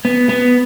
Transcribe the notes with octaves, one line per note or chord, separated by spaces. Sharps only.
B3
B3